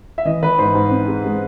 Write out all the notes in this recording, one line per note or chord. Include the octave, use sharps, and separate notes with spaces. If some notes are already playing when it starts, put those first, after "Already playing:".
E5
E3 D#5
E3 B4
G#2 C5
G#2
C4
G#3
G#3